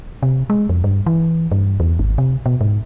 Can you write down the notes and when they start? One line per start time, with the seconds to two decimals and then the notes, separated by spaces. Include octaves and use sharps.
0.23 C3
0.50 G#3
0.69 F2
0.84 G2
1.06 E3
1.52 G2
1.80 E2
1.99 G#1
2.18 C3
2.46 B2
2.61 G#2